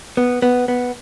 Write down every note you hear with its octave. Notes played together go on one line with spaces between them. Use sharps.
B3
B3
B3